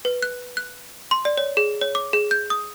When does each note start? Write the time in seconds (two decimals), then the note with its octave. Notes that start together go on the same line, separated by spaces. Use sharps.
0.05 B4
0.22 F#6
0.57 F#6
1.11 C6
1.25 D5
1.37 C#5
1.57 G#4
1.81 C#5
1.95 D6
2.13 G#4
2.31 G6
2.50 D#6